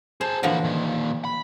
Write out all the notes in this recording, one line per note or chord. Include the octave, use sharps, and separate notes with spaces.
G#4 C5 A5
A#2 D3 E3 F3 F#4
A#2 D#3
B5